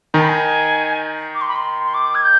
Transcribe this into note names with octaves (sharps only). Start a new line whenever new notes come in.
D#3 D#4 G#5
B5
G#5
D6
C6
B5
C6
C6
D6
G#6
G6